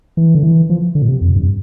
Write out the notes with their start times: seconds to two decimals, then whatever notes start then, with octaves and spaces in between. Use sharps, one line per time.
0.17 E3
0.35 D3
0.43 E3
0.70 F3
0.95 D3
1.02 A#2
1.08 C3
1.21 F2
1.36 G2